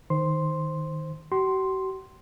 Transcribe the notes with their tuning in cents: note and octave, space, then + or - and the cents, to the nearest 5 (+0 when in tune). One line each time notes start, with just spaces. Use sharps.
D#3 +0 C5 +0 C6 +0
F#4 +45 C6 +0